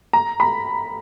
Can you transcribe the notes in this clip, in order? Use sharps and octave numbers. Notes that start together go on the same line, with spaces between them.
A#5
B5